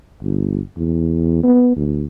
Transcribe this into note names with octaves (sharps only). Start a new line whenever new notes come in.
G1
E2
B3
D2